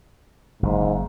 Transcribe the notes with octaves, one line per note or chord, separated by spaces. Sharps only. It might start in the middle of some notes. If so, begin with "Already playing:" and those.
F#1 G#2